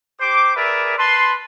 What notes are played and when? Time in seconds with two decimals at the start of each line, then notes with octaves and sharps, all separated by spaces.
0.21 G4 C5 D6
0.56 G#4 A#4 B4 D5 E5
0.98 B4 A5 C6